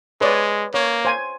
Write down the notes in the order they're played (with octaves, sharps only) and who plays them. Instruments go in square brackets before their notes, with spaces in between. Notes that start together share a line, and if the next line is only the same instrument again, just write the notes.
[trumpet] G#3 [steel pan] B4 C#5 D5
[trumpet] A#3 [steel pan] C#5
[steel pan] C5 G#5